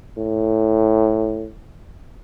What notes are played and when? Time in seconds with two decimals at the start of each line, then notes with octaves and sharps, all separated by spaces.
0.18 A2